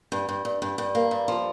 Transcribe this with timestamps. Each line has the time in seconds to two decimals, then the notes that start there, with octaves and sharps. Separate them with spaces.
0.12 G2
0.29 G2
0.45 G2
0.62 G2
0.78 G2
0.95 A#3
1.11 G2
1.28 F3